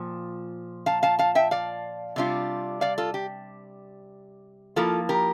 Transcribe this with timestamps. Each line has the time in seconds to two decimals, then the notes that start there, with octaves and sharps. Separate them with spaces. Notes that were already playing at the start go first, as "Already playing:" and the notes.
Already playing: A#2 F3 G5
0.86 F5 A5
1.03 F5 A5
1.19 F5 A5
1.35 E5 G5
1.51 D5 F5
2.16 C3 G3 D4 F4
2.81 D5 F5
2.98 F4 A4
3.14 G4
4.76 F3 A#3 E4 F4 A4
5.09 G4 A#4